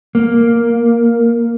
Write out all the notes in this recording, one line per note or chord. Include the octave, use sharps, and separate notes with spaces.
A#3